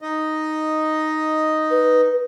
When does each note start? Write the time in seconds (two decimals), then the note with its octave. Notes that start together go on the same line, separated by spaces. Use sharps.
0.01 D#4 D#5
1.70 B4